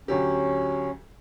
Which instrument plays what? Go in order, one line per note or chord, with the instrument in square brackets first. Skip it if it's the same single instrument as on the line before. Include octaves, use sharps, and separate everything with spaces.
[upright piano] D2 F#3 G4 [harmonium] C#4